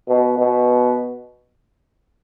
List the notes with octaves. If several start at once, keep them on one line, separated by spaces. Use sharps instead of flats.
B2
B2